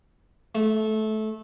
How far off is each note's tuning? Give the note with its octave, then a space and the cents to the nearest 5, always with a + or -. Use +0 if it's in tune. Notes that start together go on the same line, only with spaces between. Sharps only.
A3 -20